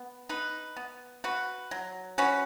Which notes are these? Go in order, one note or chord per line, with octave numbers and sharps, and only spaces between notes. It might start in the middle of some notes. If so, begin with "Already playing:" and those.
Already playing: B3
D#4 B4
B3
F#4 B4
F#3
C#4 F#4 B4